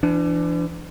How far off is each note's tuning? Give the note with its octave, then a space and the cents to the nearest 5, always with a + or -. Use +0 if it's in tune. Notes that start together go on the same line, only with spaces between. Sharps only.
E3 +40 D4 +0